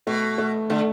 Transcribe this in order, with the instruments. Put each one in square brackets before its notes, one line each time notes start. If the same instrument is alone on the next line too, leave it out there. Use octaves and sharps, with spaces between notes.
[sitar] B2 [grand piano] A3
[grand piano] A3
[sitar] D3 [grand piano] A3